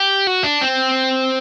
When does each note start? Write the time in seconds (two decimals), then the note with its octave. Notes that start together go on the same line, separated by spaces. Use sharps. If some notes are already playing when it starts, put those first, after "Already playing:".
Already playing: G4
0.27 F#4
0.44 D4
0.61 C4